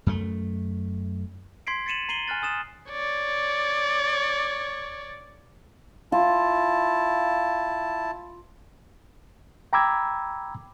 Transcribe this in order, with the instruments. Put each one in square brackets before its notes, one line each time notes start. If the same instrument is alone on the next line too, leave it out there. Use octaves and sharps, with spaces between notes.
[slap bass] F#2 A3
[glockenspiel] C6 G#6 B6 C7 D7
A6 B6 C#7 D#7 E7 F#7
A#5 C7 D#7 F#7 G7
G#5 F6 F#6 A6
G#5 D#6 A6 E7
[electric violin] C#5 D5
[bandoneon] E4 A5 [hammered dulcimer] F4
[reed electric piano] G5 A#5 B5 D6 E6 G#6